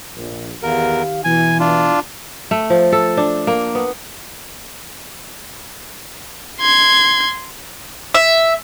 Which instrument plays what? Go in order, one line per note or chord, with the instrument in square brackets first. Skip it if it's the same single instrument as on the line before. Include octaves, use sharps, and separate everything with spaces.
[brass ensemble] A#1
[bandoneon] E2 A#4 [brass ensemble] D#3 G4 F5
[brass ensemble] B2 E3 [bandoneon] G#5
[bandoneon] D4 F4
[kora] A3
F3
A4
D4
A#3
B3
[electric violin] C6 G#6
[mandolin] E5